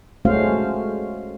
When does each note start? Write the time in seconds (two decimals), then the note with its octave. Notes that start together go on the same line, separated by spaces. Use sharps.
0.25 G#3 A3 C#4 F#4 C5 F5